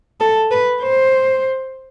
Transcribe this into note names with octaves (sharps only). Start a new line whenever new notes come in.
A4
B4
C5